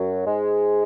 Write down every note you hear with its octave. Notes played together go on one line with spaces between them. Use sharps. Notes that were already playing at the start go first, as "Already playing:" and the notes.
Already playing: F#2 F#3
G#2 G#3